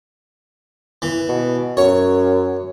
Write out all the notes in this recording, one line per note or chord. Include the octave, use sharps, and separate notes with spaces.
E3
B2
F#2 C#5